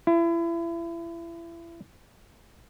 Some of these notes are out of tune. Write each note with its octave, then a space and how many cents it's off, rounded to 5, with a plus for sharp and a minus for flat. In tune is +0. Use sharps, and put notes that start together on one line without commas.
E4 +30